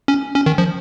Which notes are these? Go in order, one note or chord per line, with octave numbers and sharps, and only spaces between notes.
C#4
C#4
D#3
F3